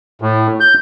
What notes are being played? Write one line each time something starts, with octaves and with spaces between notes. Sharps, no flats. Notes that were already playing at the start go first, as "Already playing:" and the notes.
A2
G6